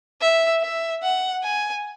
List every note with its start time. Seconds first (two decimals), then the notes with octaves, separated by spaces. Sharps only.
0.21 E5
0.62 E5
1.02 F#5
1.43 G#5